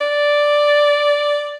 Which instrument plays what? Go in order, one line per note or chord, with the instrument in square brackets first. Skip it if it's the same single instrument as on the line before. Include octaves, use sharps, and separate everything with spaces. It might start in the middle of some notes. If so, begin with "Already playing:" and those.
[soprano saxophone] D5